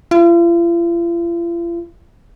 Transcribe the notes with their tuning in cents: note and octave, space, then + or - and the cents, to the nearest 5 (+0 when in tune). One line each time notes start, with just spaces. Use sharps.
F4 -45